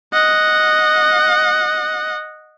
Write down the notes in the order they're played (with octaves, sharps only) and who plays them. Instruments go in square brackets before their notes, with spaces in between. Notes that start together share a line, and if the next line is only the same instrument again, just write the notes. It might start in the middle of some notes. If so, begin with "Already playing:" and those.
[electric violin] D#5 F#5